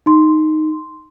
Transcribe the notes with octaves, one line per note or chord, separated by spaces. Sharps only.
D#4 C6